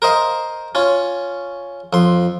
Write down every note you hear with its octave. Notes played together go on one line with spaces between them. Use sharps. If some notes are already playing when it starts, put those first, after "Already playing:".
A#4 C5 D#5 F5
C#4 F4
F2 C6